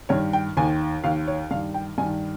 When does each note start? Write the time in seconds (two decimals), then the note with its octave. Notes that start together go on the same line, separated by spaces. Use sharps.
0.09 G2 D#3 C#5
0.33 G5
0.57 D#2 D#3 G#5
1.04 D#2 D#3 F5
1.27 C#5
1.51 G2 D#3 F5
1.74 G5
1.98 G2 G#5
2.03 D#3